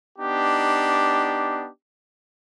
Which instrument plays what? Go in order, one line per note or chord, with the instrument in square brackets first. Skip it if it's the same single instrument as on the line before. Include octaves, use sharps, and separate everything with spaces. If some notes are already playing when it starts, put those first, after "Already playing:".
[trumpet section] B3 D4 D#4 G4